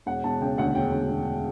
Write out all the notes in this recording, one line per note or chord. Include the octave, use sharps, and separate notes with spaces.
E1 F#5
E1 A5
C#3 G5
D2 F#5
E1 G5
D2
E1